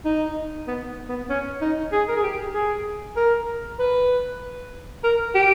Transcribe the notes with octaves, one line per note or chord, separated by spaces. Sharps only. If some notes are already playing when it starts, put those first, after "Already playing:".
D#4
B3
B3
C#4
D#4
G#4
A#4
G#4
G4
G#4
A#4
B4
A#4
G4